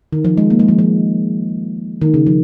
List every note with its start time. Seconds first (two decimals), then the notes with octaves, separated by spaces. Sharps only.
0.12 D#3
0.25 F3
0.37 G#3
0.50 A#3
0.59 G#3
0.68 F3
0.79 F3
2.01 D#3
2.14 C#3
2.27 F3